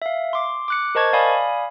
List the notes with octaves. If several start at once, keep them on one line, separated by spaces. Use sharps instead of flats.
E5 F5
C6 D6
D6 F#6 C#7
A#4 C5 D#5 A5 C#6 G#6
D5 F5 G#5 B5 D#6